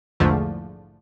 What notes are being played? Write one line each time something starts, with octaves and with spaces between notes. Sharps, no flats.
A#1 E2 G#2 D3 F3 A3